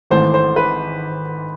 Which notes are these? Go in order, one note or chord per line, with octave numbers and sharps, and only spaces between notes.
G#1 G#2 E3 A3 C5
C5
B4